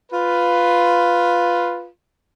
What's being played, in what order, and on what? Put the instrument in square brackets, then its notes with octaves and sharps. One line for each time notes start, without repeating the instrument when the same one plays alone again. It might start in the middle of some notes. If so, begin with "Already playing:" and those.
[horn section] F4 B4